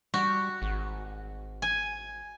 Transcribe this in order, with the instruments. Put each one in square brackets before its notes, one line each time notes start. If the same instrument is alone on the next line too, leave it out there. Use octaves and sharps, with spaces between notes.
[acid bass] G3 [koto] F#4
[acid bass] G#1
[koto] G#5